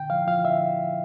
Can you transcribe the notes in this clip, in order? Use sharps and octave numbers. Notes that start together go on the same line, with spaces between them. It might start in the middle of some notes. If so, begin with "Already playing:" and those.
Already playing: A#2 D3 G5
F3 F5
F3 F5
D3 E5